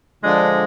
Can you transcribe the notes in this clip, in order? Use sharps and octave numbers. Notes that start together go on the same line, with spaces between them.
D3 F3 G#3 D4